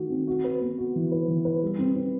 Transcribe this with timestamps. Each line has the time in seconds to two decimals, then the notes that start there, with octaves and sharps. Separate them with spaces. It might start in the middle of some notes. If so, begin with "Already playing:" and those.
Already playing: D#3 A3 F#4
0.10 C4
0.27 F#4
0.44 B4
0.61 B3
0.78 F#4
0.95 E3
1.12 B4
1.28 E3
1.45 B4
1.62 G3
1.79 C4
1.96 C4